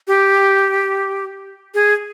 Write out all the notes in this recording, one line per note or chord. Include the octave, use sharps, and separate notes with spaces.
G4
G#4